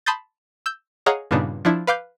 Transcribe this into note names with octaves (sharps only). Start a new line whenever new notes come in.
A5 B5 C6 D#6 G6 A6
E6 G6
G#4 C#5 D#5 F5 F#5 A#5
G2 A#2 C#3 B3 D4 D#4
F3 D4 E4
B4 F5 D6 G6